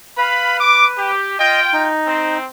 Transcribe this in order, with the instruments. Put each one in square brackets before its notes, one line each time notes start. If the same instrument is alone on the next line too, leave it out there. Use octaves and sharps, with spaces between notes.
[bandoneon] B4 [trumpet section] F5 B5
[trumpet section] D6
G4
[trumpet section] F4 G5 [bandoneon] D#5
[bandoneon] D#4
[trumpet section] C4